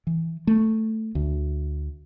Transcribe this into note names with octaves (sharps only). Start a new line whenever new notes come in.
E3
A3
D2